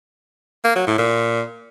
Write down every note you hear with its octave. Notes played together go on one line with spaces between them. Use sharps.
A#3
F#3
A2
A#2